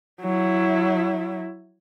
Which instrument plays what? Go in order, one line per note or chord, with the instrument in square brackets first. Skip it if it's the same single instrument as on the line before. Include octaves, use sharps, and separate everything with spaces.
[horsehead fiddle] F#3 E4